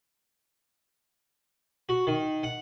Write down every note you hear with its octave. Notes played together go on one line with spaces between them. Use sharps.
F#4
D#3
F#5